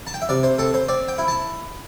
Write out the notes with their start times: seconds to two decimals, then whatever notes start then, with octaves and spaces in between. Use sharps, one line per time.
0.07 A5
0.14 G5
0.22 E5
0.29 C3 D5
0.43 C5
0.58 C4 A4
0.74 C5
0.88 C4 D5
1.08 G5
1.18 E4
1.28 A5